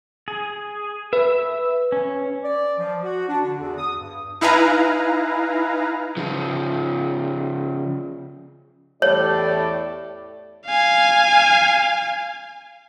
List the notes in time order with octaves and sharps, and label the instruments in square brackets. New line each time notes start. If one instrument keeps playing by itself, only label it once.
[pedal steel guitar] G#4
[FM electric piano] B4 [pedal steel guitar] E5
[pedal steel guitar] C#4
[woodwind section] D5
F3
F#4
D4
D3
E2
D#6
G2
[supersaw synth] D#4 E4 B4 F5 G#5 A#5
[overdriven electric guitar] C#3 F3
[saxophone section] E2 G4 A4 [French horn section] A2 D5 [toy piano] C#5
[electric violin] F5 G#5